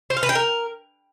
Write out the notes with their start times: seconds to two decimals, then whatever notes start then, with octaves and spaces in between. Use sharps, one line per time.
0.10 C5
0.17 F5
0.23 B4
0.29 G5
0.35 A#4